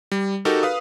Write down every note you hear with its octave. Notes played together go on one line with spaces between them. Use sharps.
G3
D#4 F#4 G4 A4 A#4
B4 F5 D#6